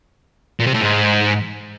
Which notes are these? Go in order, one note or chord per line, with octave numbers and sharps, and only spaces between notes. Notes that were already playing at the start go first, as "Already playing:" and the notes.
A#2
C3
A2
G#2